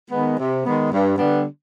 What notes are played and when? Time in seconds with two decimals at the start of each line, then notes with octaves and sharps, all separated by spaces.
0.10 D#3 G#3 B3
0.37 C3
0.63 D#3 G#3 B3
0.91 G2
1.17 D3 G3 B3 D4